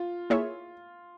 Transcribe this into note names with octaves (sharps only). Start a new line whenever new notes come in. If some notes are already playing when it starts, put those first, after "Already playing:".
Already playing: F4
A#3 E4 G#4 C#5 E5